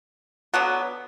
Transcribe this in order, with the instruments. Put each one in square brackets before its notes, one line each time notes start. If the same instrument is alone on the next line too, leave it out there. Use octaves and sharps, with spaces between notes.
[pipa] D3 F#3 B3